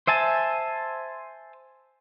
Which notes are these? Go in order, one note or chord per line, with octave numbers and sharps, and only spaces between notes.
C5 E5 G#5 A5